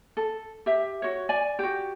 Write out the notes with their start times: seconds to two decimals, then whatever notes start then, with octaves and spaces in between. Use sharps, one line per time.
0.17 A4
0.66 G4 E5
1.02 F#4 C#5
1.29 D5 G#5
1.59 F#4 G4